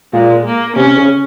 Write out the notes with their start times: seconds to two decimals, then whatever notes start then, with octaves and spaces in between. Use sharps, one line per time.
0.13 A#2 G#3
0.45 A#3
0.76 C3 C#4
0.97 C#3